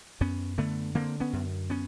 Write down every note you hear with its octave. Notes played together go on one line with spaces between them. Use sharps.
F#2 B3 C#4
D3 A3 B3
D3 A#3 C4
B3 C#4
F#2
B3 C#4